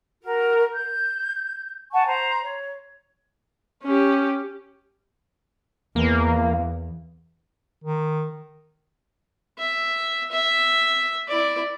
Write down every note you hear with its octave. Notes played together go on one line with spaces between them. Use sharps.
F#4 A#4
G6
F#5 G#5 A5 C#6
C5 A#5
C#5
C#4 G4
E2 A#3
D#3
E5
E5
E4 D5